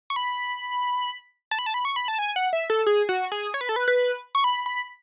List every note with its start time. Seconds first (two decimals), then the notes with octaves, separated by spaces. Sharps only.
0.10 C#6
0.16 B5
1.51 A5
1.59 B5
1.66 A5
1.74 B5
1.85 C#6
1.96 B5
2.08 A5
2.19 G#5
2.36 F#5
2.53 E5
2.70 A4
2.86 G#4
3.09 F#4
3.32 G#4
3.54 C#5
3.61 B4
3.69 A4
3.76 B4
3.88 B4
4.35 C#6
4.44 B5
4.66 B5